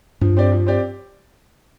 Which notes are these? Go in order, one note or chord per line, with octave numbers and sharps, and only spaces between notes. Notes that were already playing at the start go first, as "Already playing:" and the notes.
G2 F3
C4 G4 D5
F3
C4 G4 D5